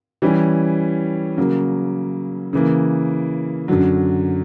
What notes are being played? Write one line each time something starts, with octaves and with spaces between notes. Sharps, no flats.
E3 G3 C#4
C#3 F#3 A#3
C#3 E3 A#3
F#2 D3 F#3